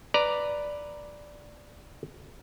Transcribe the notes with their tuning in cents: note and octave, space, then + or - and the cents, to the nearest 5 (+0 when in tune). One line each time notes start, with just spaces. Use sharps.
B4 +0 D5 +0 A#5 +0